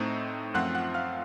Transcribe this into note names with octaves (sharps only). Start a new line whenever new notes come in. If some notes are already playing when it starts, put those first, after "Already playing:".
Already playing: A2 A3 C4 D#4
F#2 F3 A3 C4 F4 F#5 F#6
F#5 F#6
F5 F6